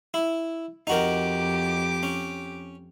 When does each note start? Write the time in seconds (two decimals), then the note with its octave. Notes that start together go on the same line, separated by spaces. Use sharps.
0.14 E4
0.87 F2 D#4 F#4 G4 A#4 D6
2.03 C#4